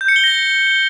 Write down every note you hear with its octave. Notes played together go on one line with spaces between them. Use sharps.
G6
C#7
G7
A#6